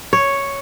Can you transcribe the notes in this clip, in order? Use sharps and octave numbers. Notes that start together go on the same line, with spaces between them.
C#5